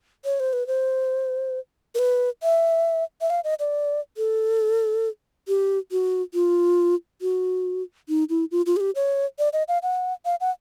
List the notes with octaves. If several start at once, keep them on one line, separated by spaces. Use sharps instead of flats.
C#5
C5
B4
C5
A#4
B4
E5
E5
F5
D#5
D5
A4
G4
F#4
F4
F#4
D#4
E4
F4
F4
G#4
G4
C#5
D5
D#5
F5
F#5
F5
F#5